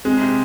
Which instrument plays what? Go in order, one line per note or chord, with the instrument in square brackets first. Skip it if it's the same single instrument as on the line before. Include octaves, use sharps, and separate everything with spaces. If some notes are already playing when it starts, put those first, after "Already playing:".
[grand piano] G#3 [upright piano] C4
[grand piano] C3